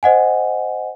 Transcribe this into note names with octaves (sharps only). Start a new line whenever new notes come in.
C5 D#5 F#5 G#5